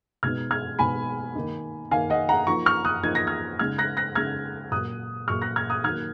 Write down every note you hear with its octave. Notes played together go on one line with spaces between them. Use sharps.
B2 G#3 B3 D#4 F6 G#6
F6 G#6
B2 G#3 B3 D#4 G#5 B5
D#3 A#3 D#4
D#3 A#3 D#4 F5 G#5
D#5 F#5
F#5 A#5
F3 A#3 D#4 A#5 C#6
C#6 F6
D#6 F#6
F3 A#3 D#4 G#6
A#6
F6 G#6
C#3 G#3 D#4 F6 G#6
F#6 A#6
F#6 A#6
C#3 G#3 D#4 F6 G#6
A#2 F#3 A#3 D#6 F#6
A#2 F#3 A#3 C#6 F6
F#6 A#6
F6 G#6
D#6 F#6
D#3 F#3 A#3 F6 G#6